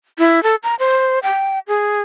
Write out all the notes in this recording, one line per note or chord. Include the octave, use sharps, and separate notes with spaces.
E4
A4
A#5
C5
G5
G#4